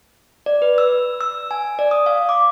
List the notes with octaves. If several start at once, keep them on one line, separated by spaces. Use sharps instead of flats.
D5
B4
E6
E6
G#5
D5
D#6
F5
D6